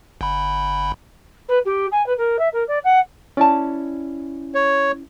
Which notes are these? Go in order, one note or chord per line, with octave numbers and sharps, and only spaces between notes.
G1 B5
B4
G4
G#5
B4
A#4
E5
A#4
D5
F#5
C#4 E4 D5 A5
C#5